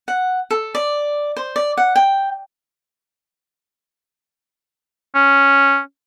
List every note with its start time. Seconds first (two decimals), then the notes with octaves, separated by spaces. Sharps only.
0.08 F#5
0.50 A4
0.75 D5
1.37 C5
1.56 D5
1.77 F#5
1.96 G5
5.15 C#4